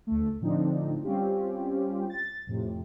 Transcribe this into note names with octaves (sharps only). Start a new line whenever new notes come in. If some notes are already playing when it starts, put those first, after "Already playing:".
D2 D3 A3
A2 D3 F3 C4 D4 D#4
G3 C4 C#4 F4 G4
A6
F2 A2 C3